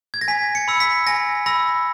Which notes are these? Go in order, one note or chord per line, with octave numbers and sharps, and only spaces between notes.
G#6
A#6
G#5 B6
C#7
B5 E6
B6
G#5 A#6
B5 E6 A#6